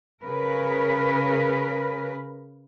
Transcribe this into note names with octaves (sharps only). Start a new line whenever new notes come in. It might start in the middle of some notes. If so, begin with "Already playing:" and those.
C#3 A#4 B4